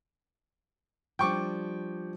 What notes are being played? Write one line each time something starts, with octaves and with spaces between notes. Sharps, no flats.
F3 G3 D4 G5 C#6 D6